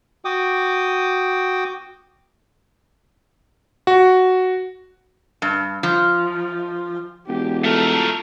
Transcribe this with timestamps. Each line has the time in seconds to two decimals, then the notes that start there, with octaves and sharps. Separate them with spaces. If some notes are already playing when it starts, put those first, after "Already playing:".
0.25 F#4 G5 D6 D#6
3.87 F#4
5.42 G2
5.83 F3
7.28 E1 G4
7.64 A3 F4 A4 A#4